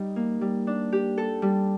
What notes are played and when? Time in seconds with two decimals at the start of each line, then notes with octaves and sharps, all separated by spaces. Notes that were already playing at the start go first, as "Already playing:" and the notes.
Already playing: G3 D#4
0.16 A#3
0.41 G3
0.67 D4
0.92 G4
1.18 A4
1.42 G3